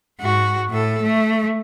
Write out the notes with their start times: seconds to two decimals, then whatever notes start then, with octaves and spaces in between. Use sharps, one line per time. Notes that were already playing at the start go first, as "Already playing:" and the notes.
0.20 G#2 F#4
0.70 A2 A4
1.02 A3